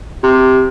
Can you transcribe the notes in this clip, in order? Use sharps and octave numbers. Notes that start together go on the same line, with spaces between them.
C3